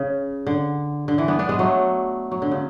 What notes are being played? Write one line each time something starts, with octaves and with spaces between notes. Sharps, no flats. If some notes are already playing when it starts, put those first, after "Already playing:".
Already playing: C#3
D3
D3
E3
B3 D4
B3 D4
G#3 B3
F#3 A3
F#3
D3
C#3